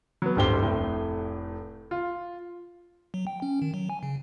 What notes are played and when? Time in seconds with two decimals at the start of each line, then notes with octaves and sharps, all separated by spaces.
0.22 F#3 B3
0.36 D1 G1 G2 G4 C5 G7
0.62 F1 A2
1.91 F4
3.14 F#3
3.27 G5
3.42 C#4
3.62 D#3
3.74 F#3
3.90 G#5
4.03 C#3